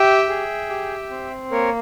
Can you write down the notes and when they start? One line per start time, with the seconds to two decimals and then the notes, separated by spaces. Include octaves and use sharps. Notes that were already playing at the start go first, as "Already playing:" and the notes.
Already playing: G4 E5 G5
0.29 G#4
0.69 G4
1.10 C4
1.51 A#3 A#4 C#5